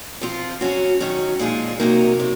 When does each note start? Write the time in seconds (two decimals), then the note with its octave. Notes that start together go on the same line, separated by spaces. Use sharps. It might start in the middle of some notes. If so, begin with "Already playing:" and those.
0.21 F3 C4 F4
0.61 F#3 C#4 F#4
1.00 D#3 F#3 C#4
1.39 A#2 F3 G#3 D#4 G#4
1.80 C3 F#3 A#3 D#4
2.20 C3 F#3